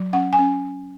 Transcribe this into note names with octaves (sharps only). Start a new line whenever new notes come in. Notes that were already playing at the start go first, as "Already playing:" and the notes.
Already playing: F#3
C#4 F#5
G#5
C#4